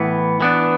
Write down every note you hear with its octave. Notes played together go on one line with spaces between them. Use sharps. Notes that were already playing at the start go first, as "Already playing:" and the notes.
Already playing: A2 E3 B3
E3 B3 D4